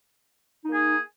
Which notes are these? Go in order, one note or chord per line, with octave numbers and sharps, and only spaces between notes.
A#3 D#4 G#4